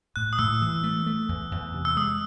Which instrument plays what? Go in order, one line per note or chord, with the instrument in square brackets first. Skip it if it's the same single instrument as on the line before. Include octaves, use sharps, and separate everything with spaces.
[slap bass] A2 [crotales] F#6
[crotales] D#6
[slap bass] A2 [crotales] E6
[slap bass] E3
A3
A3
E2
E2
C3
[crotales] E6
[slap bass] G#3 [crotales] D#6